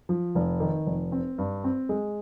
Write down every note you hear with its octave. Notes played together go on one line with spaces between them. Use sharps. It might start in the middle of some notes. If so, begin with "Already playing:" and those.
F3
F1
D#3
F1
C4
G2
C4
G#3